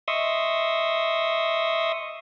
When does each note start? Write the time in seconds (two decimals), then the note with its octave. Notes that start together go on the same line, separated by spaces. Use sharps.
0.08 D#5 E5 C6 C#6 D#6 E6